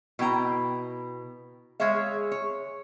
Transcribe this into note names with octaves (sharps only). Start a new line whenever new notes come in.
B2 E4 G5 A#5
G#3 G#4 C#5 E5 F5
C#5